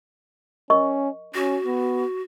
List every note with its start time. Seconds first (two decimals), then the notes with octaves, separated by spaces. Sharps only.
0.70 C#4 A#4 D#5 C#6
1.35 C#4 F#4
1.66 B3